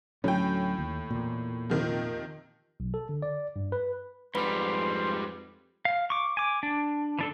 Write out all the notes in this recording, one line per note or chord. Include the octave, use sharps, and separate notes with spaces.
D2 A2 F#3 C#4 G5
D#2
E2 A#2
C3 D#3 F3
B1
A4
D3
D5
G2
B4
F2 G#2 G3 B4 B5 C6
F5
C#6 D6
G#5 D6
D4
E3 D4 A4